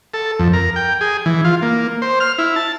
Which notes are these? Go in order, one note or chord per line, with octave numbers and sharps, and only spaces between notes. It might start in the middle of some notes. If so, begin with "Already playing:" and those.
A4
F2
A#4
G5
G#4
E3
F4
A#3
C5
F6
E4
A5